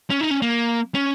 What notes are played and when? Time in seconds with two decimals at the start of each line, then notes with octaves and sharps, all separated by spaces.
0.10 C#4
0.21 D#4
0.31 C#4
0.42 A#3
0.94 C#4